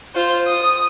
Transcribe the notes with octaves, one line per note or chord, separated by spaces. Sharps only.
F4 C5
D#6